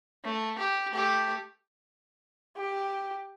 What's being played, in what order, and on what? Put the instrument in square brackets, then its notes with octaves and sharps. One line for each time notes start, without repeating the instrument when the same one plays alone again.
[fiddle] A3
G4
A3 G4
[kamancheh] G4